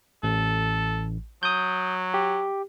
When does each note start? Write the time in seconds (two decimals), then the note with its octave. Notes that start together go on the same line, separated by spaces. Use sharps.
0.23 A1 A4
1.43 F#3 D#6 G6
2.14 G4